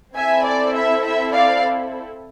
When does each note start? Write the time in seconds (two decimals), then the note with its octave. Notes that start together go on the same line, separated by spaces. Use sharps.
0.15 C4 E4 A4 E5 G#5
0.45 D5
0.75 E5
1.04 E5
1.34 D5 F5